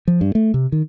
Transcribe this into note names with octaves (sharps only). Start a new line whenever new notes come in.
F3
G2
A3
C3
D#3